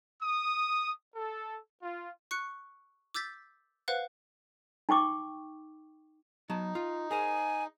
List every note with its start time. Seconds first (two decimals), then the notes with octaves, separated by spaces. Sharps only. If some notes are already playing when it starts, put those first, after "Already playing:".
0.23 D#6
1.15 A4
1.82 F4
2.31 C#6 F#6 C#7
3.14 D6 E6 G6 A6 B6
3.88 B4 C5 F5 F#5 F#6
4.89 D#4 G5 C#6 D6
6.50 F#3 B3 D#4 A5
6.75 F4
7.11 G#4 A#4 C5 G#5